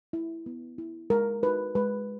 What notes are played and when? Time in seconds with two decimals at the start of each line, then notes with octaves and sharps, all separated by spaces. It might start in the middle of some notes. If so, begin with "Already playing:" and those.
0.13 E4
0.46 B3
0.78 E4
1.10 G#3 A#4
1.43 D#4 F#4 B4
1.75 G#3 B4